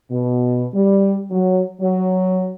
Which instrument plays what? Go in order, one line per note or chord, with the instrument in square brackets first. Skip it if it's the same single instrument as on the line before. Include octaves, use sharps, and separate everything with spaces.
[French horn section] B2
G3
F#3
F#3